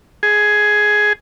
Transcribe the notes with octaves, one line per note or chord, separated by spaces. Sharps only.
G#4